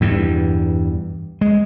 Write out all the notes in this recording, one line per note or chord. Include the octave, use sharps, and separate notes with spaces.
E2 G2
G#3